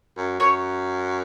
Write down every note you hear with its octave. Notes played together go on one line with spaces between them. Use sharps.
F#2
F#2 C#5